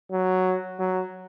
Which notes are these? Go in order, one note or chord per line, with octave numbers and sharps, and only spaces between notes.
F#3
F#3